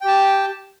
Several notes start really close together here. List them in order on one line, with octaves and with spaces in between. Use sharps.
G5 G4 A5